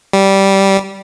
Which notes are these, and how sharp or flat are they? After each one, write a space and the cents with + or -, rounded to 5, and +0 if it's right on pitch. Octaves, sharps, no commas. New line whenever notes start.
G3 -10